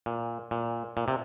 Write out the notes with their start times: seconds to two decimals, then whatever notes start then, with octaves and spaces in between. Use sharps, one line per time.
0.06 A#2
0.51 A#2
0.97 A#2
1.08 C3